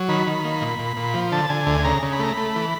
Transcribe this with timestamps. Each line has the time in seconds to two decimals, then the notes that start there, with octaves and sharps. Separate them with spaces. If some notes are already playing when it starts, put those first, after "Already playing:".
Already playing: F#3
0.09 D#3 B5
0.27 D#3
0.44 A#3
0.62 A#2
0.79 A#2
0.96 A#2
1.14 F3
1.32 D3 A5
1.49 D3 G#5
1.67 D2
1.84 C#3 A#5
2.03 C#3
2.12 B5
2.19 A3 A#5
2.33 A3 B5
2.56 E3